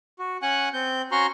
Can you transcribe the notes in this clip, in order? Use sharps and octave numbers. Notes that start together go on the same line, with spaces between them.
F#4
C#4 F#5 G#5 F#6
C4 G6
C#4 F#4 A#5 C6 C#6